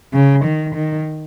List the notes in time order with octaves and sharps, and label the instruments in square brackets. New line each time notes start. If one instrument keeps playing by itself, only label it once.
[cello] C#3
D#3
D#3